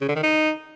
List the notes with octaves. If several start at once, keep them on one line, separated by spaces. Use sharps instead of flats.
C#3
D3
D#3
D#4